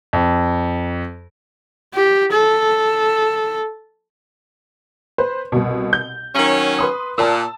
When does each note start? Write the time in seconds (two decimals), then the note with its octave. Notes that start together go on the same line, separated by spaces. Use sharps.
0.13 F2
1.94 G4
2.32 A4
5.18 B4 C5
5.52 C2 B2
5.93 G6
6.35 D#3 F#3 C#4
6.79 B4 C6 D#6
7.18 A#2 A5 E6